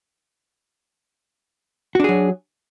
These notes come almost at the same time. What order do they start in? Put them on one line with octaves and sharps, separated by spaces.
F#4 D4 G#4 F#3